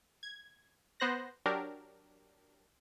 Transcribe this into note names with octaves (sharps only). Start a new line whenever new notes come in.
G#6
B3 C5 F#6 A#6
F#3 D4 G4 A#4